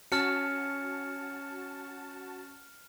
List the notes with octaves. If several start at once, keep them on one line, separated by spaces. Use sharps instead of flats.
C#4 F#4 A5 F6 C#7